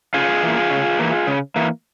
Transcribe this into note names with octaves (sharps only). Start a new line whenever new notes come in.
C#3 F4 G#4
E3 A#3
C#3
E3 A#3
C#3
E3 A#3